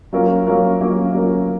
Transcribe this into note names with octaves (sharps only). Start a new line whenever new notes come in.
F#3 A#3 C#4 F4 A#4
F#3 A#3 C#4 F4 A#4
F#3 A#3 C#4 F4 A#4
F#3 A#3 C#4 F4 A#4